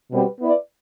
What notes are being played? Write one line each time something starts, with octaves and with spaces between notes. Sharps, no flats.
B2 G3 C4 F#4 B4
B3 E4 B4 D5